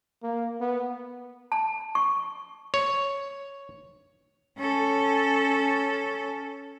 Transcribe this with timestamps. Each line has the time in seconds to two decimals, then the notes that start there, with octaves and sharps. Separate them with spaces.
0.23 A#3
0.60 B3
1.52 A5
1.95 C#6
2.74 C#5
4.58 C#4 A4